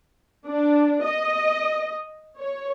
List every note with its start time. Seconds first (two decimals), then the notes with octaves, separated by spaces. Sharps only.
0.47 D4
1.05 D#5
2.38 C#5